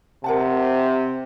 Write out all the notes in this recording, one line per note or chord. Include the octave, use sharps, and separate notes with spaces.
C3 A#4 F#5 A5